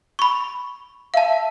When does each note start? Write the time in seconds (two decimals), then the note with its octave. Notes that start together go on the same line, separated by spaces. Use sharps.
0.19 B5 C#6
1.14 E5 F5 A5